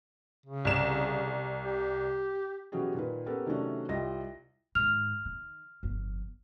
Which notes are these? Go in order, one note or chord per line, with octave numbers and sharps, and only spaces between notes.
C#3
C2 E7
G4
B2 E3 F#3 C#4 G4 G#4
A#2 D#3 B4
B3 C#4 G4 A4 A#4
C3 D#3 F#3 A3 C#4 D4
C2 F4 G4 D#5 A#6
G#2 D#3 F6 F7
D#3
G1 F2